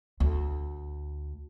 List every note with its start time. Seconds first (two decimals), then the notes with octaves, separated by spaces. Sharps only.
0.20 D2